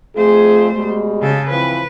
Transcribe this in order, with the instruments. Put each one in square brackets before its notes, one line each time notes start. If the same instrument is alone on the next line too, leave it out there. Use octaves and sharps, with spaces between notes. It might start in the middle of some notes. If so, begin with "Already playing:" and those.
[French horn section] F2 F4 G#4 [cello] A3 C5
[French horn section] B2 G3 G#3
[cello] C#3 A4
[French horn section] E3 F3 C4 [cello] B4